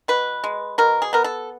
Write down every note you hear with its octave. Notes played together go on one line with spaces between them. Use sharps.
B2 B4
G#3
B2 A#4
G#4
B3 A#4
A4